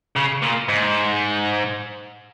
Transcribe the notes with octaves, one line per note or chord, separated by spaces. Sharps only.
C#3
A#2
G#2